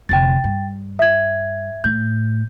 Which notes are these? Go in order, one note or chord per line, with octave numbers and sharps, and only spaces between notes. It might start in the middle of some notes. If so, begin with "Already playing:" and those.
F1 D3 G5 A6
G2
E5 G#6
A2 G6